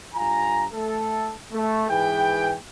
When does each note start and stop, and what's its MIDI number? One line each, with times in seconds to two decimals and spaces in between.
0.15 0.65 43
0.15 0.65 65
0.15 0.65 80
0.15 0.65 82
0.73 1.34 57
0.73 1.34 69
1.53 1.86 57
1.90 2.55 44
1.90 2.55 52
1.90 2.55 68
1.90 2.55 71
1.90 2.55 79